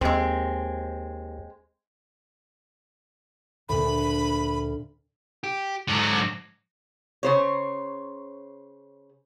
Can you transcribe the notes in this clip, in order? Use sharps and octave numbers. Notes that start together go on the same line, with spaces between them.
D#2 G#3 C4
D2 A#2 B5
G4
G#2 D3 F#3
C#3 C5 C#5